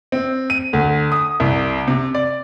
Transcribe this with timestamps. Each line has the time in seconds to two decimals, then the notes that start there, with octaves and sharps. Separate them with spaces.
0.12 C4
0.50 D#7
0.73 D2
1.12 D#6
1.40 C2
1.88 C3
2.15 D5